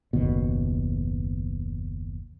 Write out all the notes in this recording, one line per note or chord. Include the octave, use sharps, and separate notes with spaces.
F#1 D#2 B2